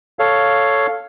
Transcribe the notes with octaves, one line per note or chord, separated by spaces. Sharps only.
A4 C#5 F5